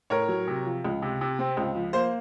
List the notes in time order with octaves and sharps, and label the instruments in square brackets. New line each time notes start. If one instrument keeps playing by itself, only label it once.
[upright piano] A2 A#4 C#5
F#3
C3
F3
C#2
C3
C3
C4
C#2
F3
A#3 C5